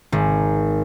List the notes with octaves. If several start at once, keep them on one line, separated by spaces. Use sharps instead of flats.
G#1